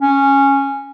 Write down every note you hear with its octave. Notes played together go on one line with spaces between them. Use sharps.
C#4